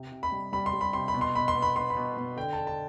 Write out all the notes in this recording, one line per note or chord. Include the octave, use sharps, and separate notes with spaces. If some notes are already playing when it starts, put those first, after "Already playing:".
Already playing: C3
C3
B5
G3
G3 B5
C6
G3
B5
C3 C6
B5
B2
C6
B2 B5
C6
B3
B5
B3 C6
B5
B2
B2
D3 G5
D3 A5
A5